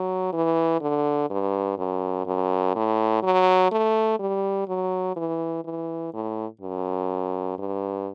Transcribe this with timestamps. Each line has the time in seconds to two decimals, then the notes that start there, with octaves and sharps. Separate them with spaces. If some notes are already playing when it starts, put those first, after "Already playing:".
Already playing: F#3
0.33 E3
0.81 D3
1.30 G2
1.78 F#2
2.26 F#2
2.75 A2
3.23 F#3
3.71 A3
4.19 G3
4.68 F#3
5.16 E3
5.65 E3
6.13 A2
6.61 F#2
7.59 G2